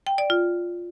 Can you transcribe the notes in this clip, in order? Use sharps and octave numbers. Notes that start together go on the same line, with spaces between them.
G5
D5
F4